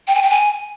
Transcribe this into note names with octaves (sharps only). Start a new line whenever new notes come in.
G5
G#5
G5
G#5